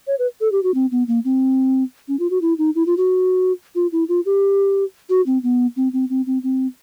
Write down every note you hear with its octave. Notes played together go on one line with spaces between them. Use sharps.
C#5
B4
A4
G4
F#4
C4
B3
A#3
C4
C#4
F4
F#4
E4
D#4
E4
F4
F#4
F4
E4
F4
G4
F#4
C4
B3
C4
C4
C4
C4
C4